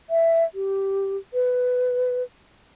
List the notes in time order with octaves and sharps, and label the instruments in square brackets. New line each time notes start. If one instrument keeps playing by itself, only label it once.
[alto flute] E5
G4
B4